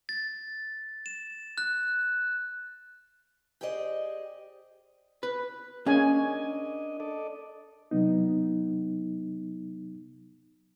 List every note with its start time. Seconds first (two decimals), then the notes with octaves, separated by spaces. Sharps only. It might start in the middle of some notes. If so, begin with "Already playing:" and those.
0.09 A6
1.06 E7
1.58 F#6
3.61 G4 G#4 C5 D5 D#5
5.23 B4
5.86 A#3 C#4 D4 G#4 D#5 G#5
7.00 A4 D5 D#5
7.91 C3 F#3 B3 D#4